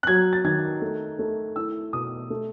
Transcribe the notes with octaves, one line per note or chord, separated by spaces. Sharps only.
F#6
F#3 G#6
A6
D#3 G#6
A3
A3
E4 E6
B2 D#6
A3